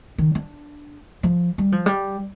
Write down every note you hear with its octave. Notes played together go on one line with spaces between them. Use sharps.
D#3
D4
F3
G3
F3
G3